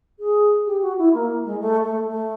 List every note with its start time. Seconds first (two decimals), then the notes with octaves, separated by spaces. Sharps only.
0.19 G#4
0.66 G4
0.82 F#4
0.98 E4
1.14 A#3
1.44 G#3
1.60 A3
1.83 A3
2.07 A3